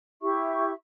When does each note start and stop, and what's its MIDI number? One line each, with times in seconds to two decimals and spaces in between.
0.22 0.72 64
0.22 0.72 67
0.22 0.72 76
0.22 0.72 85